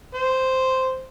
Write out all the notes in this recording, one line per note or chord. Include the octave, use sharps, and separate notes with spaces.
C5